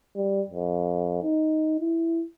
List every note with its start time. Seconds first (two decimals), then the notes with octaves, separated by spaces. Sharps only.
0.16 G3
0.50 F2
1.24 D#4
1.80 E4